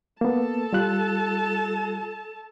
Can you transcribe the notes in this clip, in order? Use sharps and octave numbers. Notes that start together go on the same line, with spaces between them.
A#3 B3 A4 A5
G3 F4 F#6